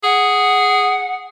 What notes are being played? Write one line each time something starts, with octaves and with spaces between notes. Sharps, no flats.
G#4 F#5